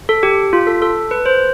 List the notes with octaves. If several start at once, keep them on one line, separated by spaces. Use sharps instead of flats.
A4
G4
F4
A4
A4
B4
C5